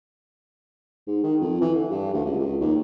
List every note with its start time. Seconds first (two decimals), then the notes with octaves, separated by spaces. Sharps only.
1.07 G#2
1.23 D#3
1.41 F2
1.61 E3
1.75 D3
1.90 G2
2.14 D2
2.25 C#2
2.39 C#2
2.61 D#2